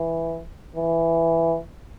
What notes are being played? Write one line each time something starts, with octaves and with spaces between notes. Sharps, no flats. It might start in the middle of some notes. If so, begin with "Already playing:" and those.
Already playing: E3
E3